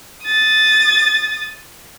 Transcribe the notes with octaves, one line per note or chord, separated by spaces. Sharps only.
D#6 A6